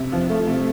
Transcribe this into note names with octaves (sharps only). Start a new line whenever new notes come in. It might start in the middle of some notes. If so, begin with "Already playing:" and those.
Already playing: C3
F3
A3
C3